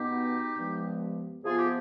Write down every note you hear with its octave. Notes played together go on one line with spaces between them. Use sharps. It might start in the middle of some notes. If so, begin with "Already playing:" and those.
Already playing: B2 B3 D#4 G4
G2 F3 G#3 B3
C3 F3 B3 F4 G#4
G4